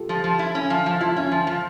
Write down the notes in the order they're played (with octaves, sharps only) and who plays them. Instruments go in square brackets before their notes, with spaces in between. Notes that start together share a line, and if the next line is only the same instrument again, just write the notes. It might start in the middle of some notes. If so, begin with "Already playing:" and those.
Already playing: [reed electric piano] F4 G4 A4
[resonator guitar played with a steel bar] F3
F3
E4
C#4
F3
F3
[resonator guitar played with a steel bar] E4 [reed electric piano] F4
[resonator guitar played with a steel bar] C#4
F3
F3